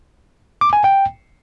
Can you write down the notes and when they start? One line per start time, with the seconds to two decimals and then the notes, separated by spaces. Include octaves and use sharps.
0.61 D6
0.73 G#5
0.84 G5